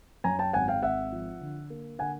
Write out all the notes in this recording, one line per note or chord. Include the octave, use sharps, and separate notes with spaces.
F#2 G#5 A#5
G5 A5
G#1 F#5 G#5
F5 G5
G#1 E5 F#5
F3
D3
A#3
D3 F#5 G#5